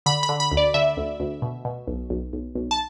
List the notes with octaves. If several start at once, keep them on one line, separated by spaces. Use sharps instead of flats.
D3 B5
B5
D3
B5
D2
D5
D3 E5
D2
D2
B2
B2
B1
B1
B1
B1
A5